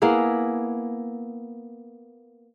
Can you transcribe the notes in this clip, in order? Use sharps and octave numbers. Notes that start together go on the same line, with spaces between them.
A#3 B3 E4 G#4